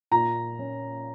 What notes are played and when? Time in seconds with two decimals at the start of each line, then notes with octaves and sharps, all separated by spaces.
0.11 A#2 A#5
0.59 C#4